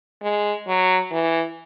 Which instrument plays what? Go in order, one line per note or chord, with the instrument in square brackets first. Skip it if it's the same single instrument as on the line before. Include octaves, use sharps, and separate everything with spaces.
[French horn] G#3
F#3
E3